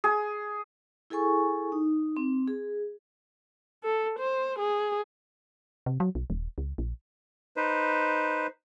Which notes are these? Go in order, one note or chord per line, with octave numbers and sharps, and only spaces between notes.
G#4
E4 G#4 A4 G#5 C#6
D#4
C4
G#4
A4
C5
G#4
C3
F#3
B1
D#1
C#2
A#1
D#4 B4 C5